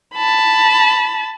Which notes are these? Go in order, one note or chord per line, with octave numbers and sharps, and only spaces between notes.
A5 B5